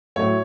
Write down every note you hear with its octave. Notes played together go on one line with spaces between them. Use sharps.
A2 F#3 A3 C#5